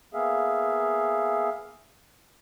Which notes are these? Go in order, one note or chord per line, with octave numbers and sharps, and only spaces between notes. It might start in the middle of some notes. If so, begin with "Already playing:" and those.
A#3 B3 G#4 E5 F5